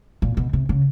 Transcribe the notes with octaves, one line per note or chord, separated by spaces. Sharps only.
A#2
B2
C3
C#3